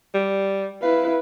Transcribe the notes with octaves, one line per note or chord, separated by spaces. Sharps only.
G3
E4 B4 F5